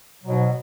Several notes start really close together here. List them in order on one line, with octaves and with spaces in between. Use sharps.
F#3 B2 G#2